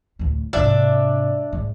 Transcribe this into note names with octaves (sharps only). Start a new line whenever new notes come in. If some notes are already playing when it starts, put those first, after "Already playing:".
D2 A2
G#2 C3 D4 D5 E5
G#2